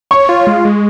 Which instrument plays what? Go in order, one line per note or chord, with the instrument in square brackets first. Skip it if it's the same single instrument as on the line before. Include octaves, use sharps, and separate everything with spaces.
[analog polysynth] C#5 [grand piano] C#6
[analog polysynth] F4
G#3
G#3